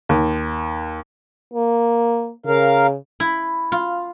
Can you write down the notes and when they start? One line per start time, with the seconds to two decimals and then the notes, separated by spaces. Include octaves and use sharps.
0.09 D#2
1.53 A#3
2.46 C#3 A#4 F5
3.20 E4
3.72 F4